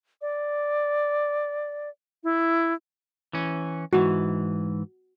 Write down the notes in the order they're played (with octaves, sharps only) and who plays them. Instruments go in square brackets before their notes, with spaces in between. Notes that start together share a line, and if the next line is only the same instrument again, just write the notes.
[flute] D5
E4
[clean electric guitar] E3 C#4
[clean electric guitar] G#2 E3 [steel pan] F#4